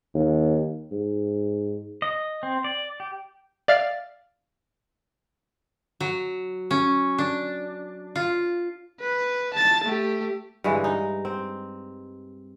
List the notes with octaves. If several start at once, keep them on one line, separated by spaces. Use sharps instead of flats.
D#2
G#2
D#5
C4
D5
G4
D5 E5 F5 F6 A6
F#3
C#4
D4
F4
B4
A5 A6
A3 G4
G2 D3 E3 G#3
D#4
C4